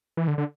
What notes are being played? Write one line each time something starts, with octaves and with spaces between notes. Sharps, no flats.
E3
D3
D3